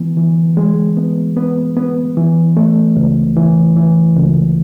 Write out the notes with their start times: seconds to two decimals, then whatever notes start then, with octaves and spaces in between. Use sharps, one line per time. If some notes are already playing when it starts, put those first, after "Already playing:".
Already playing: E3 B3
0.17 E3
0.57 G#3
0.97 B3
1.36 B3
1.77 B3
2.17 E3
2.57 A3
2.97 C#2
3.36 E3
3.76 E3
4.17 C#2